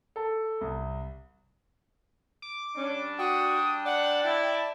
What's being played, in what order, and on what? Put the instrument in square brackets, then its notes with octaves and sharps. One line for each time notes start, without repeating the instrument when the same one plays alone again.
[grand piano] A4
C2
[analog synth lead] D6
[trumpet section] G3 D4 [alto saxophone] C#4
[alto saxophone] F#4 [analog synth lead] G5 [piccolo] D#6
[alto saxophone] D5 [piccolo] F#5
[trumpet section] E4 [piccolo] A5